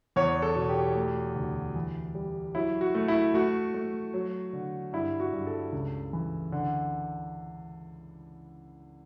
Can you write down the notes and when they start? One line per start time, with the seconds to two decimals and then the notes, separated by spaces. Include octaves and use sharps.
0.16 E2 C#5
0.42 A4
0.56 B2
0.69 G4
0.95 A3
1.36 D2
1.76 E3
2.15 G3
2.55 F#3 E4
2.81 F#4
2.95 A3
3.08 E4
3.34 A3 F#4
3.74 A3
4.14 F#3
4.53 D3
4.93 G2 E4
5.20 F#4
5.33 G2
5.47 A4
5.72 C#2
6.13 E3
6.52 D3